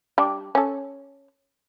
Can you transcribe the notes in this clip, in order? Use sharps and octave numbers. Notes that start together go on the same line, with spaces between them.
G3 D4
C#4 A4